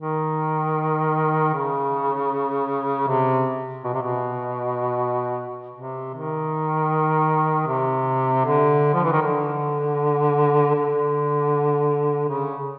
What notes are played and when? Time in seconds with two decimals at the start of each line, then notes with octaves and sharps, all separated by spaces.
0.01 D#3
1.54 C#3
3.08 C3
3.84 B2
3.94 C3
4.02 B2
5.76 C3
6.14 D#3
7.68 C3
8.45 D3
8.94 F3
9.04 E3
9.12 D#3
9.22 D3
10.75 D3
12.28 C#3